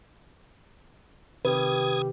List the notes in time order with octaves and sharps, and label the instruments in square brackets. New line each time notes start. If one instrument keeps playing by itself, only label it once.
[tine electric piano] C3 D#3 [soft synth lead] G4 [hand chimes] B4 [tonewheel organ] D#6 G#6